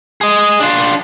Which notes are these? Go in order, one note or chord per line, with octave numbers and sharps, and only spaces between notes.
G#4 D#5
D4 F4